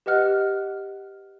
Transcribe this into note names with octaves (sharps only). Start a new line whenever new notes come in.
G4 B4 D#5 F#5 F6 F#6